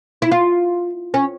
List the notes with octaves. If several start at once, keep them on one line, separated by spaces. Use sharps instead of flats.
E4
F4
C#4